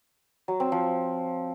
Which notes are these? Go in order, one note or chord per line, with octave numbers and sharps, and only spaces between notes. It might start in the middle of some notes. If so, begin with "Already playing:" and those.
F#3
C4
F3